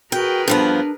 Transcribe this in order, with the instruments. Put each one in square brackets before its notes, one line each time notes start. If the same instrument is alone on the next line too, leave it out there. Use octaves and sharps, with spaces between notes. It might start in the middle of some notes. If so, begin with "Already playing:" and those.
[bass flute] F#4 [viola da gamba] G#4 A#4 B4 [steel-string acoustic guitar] G5
[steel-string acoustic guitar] G2 F3 B3 [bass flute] D4